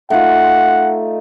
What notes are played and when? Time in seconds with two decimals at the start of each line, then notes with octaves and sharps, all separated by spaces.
0.10 A3 D#4 F4 F#5